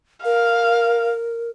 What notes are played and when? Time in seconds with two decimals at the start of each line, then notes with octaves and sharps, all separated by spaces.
0.25 A#4 F5